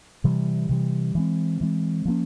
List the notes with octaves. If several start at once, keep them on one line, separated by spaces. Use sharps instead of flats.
C3 E3 G3
C3 E3 G3
E3 G#3 C4
E3 G#3 C4
F3 A#3 C#4